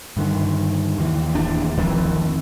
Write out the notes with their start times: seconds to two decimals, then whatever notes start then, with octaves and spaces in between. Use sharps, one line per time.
0.17 G2 D3 D#3
0.98 D#2 E3
1.35 D1 D4
1.77 D1 A1 F2 D#3 E3